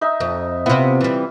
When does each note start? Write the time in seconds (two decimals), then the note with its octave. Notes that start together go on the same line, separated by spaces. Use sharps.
0.01 D#4 E5
0.20 F2
0.66 C3 B3 E4 F4
1.01 E3 G3